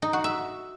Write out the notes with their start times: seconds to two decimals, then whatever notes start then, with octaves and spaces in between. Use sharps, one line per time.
0.02 D#4
0.13 F#4
0.24 E5